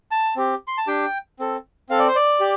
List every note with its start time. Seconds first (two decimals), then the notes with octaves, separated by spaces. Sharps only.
0.11 A5
0.36 C4 G4
0.68 C6
0.78 A5
0.87 D4 G4 G5
1.39 C4 A4
1.90 C4 A4 F5
1.99 D5
2.08 C5
2.16 D5
2.40 G4